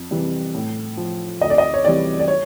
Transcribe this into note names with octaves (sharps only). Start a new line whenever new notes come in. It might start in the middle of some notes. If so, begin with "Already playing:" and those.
Already playing: F2
C3 E3 G3
A2
F3
D2 D#5
D5
D#5
C#5
C3 E3 G3 D5
D5
C#5